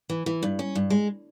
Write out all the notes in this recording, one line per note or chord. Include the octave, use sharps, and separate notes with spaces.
E3
E3
G2
C#4
G2
G#3